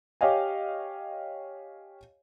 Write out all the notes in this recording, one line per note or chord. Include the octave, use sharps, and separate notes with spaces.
G4 C#5 D#5 F5 G#5